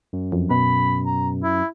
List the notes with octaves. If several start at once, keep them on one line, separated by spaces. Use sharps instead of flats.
F#2
F2
B2 B5
A#5
E4